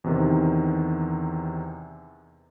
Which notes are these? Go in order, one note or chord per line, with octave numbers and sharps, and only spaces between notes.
E2 C3 D#3